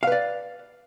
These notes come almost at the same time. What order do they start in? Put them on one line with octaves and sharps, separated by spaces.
F5 B4 D5